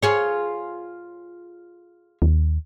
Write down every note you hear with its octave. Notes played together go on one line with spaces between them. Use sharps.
F4 G#4 C#5
D#2